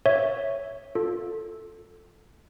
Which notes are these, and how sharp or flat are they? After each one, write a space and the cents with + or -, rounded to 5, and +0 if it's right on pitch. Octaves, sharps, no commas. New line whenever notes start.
C#5 +0 E5 +0
F4 +25 A4 +0